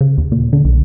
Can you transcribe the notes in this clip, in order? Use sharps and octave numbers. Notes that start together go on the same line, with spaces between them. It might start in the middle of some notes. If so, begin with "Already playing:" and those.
C#3
D#2
A#2
D3
B1